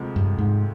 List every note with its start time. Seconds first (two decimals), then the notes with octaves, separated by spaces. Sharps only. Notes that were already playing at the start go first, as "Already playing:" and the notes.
Already playing: D2 C3 F3 G#3 C4
0.16 G2
0.38 G#2